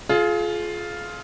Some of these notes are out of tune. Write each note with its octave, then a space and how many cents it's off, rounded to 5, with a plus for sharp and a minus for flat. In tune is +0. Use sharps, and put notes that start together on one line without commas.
F4 +0 G#4 +35